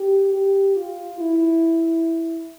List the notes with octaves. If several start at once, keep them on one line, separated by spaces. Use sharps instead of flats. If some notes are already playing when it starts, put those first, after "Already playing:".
Already playing: G4
G4
F4
E4